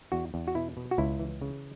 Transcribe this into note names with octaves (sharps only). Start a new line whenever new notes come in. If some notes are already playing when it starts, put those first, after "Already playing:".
E2 F#4
E2
F#4
B2 E4
B2
F#4
C#2 E4
E3
C#3